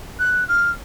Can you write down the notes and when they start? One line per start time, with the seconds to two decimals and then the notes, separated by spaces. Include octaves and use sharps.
0.19 F#6
0.48 F6